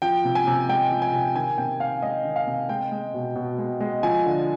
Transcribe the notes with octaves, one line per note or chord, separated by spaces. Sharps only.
F3 G5
C3
G#5
C3
G#3 G5
F3
G#5
C3
D#3 G#5
C3 G5
C3 F5
G#3 D#5
D#3
F5
C3
G#3 G5
G#3
B2
B2
G#3
G#3
F3 G#5
D3